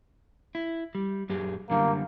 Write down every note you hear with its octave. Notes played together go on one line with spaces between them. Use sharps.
E4
G3
F#2 G4 G#4
F#2 D3 G3 A#3